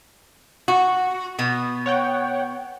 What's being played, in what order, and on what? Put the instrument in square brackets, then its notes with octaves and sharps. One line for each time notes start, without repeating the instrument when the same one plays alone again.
[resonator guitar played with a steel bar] F#4
B2 B3
[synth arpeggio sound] C#5 F#5 G5